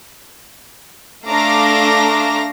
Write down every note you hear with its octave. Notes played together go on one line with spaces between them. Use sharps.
A3 D4 F5 A#5 D6 A#6